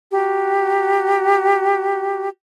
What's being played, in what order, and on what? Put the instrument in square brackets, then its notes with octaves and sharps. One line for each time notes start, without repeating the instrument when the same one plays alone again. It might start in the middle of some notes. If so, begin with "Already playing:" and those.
[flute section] F#4 G4 A#5